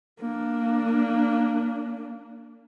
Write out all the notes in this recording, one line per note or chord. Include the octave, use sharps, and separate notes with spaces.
A#3 D4